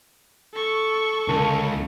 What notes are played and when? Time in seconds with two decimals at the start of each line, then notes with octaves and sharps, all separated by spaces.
0.54 A4 C#6
1.29 C#2 D3 A#4 A5